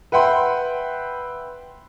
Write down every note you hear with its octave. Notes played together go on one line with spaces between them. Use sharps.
B4 E5 F#5 G5 B5 C6